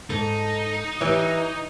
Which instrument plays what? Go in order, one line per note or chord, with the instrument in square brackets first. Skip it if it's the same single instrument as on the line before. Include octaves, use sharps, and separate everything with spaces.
[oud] G#2 A4 [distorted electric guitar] D#4
[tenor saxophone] E3 [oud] G4 C#5